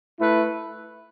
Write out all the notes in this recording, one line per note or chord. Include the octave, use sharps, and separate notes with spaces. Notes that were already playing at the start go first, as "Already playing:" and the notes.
A3 E4 B4